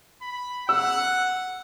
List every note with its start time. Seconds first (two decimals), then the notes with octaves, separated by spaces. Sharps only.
0.22 B5
0.69 F#5 E6